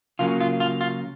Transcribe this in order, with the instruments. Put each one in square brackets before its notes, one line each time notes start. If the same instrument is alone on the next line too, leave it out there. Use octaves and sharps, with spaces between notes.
[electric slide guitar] C#3 F#3 A#3 C#4 F4
F4
F4
F4